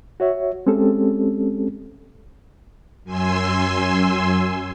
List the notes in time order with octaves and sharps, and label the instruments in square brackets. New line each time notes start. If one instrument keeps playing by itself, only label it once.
[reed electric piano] F#4 C#5 E5
G#3 C4 C#4 G4 A4
[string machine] F#2 G#5 C6 E6